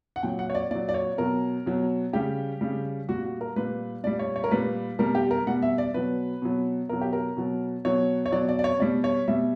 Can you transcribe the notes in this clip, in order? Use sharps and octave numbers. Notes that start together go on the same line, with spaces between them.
F#5
A#2 F#3 G5
F#5
C#5
D5
A#2 F#3 D5
D5
C#5
B2 F#3 A#4
B2 F#3
C#3 G3 G4
C#3 G3
A#2 G3 F#4
F#4
A#4
A#2 G3 B4
A#2 G3 D5
C#5
C#5
A#4
A#2 G3 B4
B2 G3 A#4
G4
A#4
B2 G3 F#5
E5
D5
B2 F#3 B4
B2 F#3
B2 F#3 A#4
G4
A#4
B2 F#3
B2 F#3 C#5
C#5
B2 F#3 D5
D5
D5
C#5
B2 G3 D5
C#5
B2 G3 E5